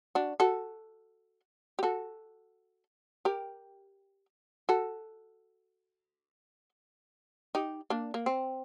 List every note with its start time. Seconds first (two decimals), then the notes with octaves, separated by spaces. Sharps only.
0.15 D4 F#4
0.40 F#4 A4
1.79 G4
1.83 F#4 A4
3.25 G4 A#4
4.69 F#4 A4
7.55 D#4 G4
7.90 A#3 D4
8.14 A#3
8.26 C4